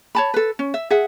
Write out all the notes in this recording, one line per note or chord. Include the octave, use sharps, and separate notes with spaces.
C#5 A5 B5
A4 B4
C#4
E5
G#4 E5 F#5